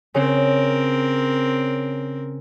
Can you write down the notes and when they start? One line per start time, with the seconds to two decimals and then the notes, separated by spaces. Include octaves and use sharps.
0.15 C#3 C4 A#4